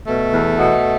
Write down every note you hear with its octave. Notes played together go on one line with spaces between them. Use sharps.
B2 A3
E2
B2